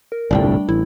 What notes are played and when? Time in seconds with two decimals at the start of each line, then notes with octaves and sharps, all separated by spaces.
0.12 A#4
0.31 G1 C2 A2 D5 G5
0.43 G3 A3 D4
0.69 A1 E4